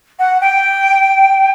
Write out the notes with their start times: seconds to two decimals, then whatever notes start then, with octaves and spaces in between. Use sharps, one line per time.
0.19 F#5
0.41 G5